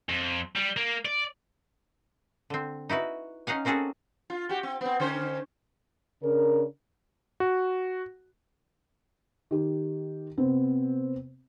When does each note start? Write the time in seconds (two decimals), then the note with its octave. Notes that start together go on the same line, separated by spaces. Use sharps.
0.09 F2
0.56 G3
0.77 A#3
1.05 D5
2.50 D3 C4
2.89 D#4 E4 F#4 B4
3.47 C#4 D#4 F5 F#5 G#5
3.65 A#3 C4 C#4 F#4 G#4 A4
4.30 F4
4.49 F#4 G4
4.63 C4
4.81 B3 C4
5.00 D3 C#4 C5
6.23 C#3 D4 A#4
7.40 F#4
9.51 D#3 G4
10.38 C3 B3 C4